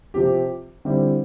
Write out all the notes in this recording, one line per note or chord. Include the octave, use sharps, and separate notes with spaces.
C3 F3 C4 G4
D3 G3 C4 E4 G4